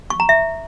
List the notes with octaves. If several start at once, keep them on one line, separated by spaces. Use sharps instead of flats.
C#6
A#5
E5